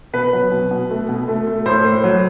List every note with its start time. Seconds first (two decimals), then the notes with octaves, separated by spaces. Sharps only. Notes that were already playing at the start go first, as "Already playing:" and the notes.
0.13 B2 B4
0.33 F#3
0.52 B2
0.71 B2
0.90 A3
1.09 B2
1.28 A3
1.47 A3
1.66 A2 C5
1.85 A2
2.04 F#3